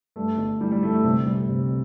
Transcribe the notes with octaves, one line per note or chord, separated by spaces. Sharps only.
G2 A3
G1
E3 G3
G3
G1 A3
A3
C3 G3
C2 G3
C3